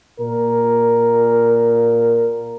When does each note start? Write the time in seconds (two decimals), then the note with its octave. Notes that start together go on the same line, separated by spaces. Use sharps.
0.20 A#2 A#4